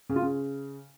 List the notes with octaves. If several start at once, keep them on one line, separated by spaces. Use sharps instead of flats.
C#3
F4
C#3